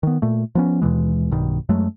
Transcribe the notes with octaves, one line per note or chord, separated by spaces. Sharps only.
D#3 B3
A#2 A3
F3 B3 C#4
D#2 B2 E3 G#3
B1 G2 B2 D#3
F#2 F#3 G#3 A3